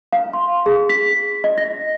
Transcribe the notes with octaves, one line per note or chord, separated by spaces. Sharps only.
F5
C6
G#4
B6
D#5
A#6